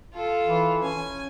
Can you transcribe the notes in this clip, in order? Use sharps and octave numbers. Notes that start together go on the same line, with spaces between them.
F4 A4
E3
C#4 G#5